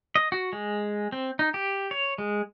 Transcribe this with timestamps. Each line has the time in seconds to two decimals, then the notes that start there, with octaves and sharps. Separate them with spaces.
0.15 D#5
0.32 F#4
0.53 G#3
1.12 C4
1.39 D#4
1.54 G4
1.91 C#5
2.18 G#3